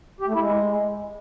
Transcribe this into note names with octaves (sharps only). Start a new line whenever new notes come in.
G4
A3
E4
G#3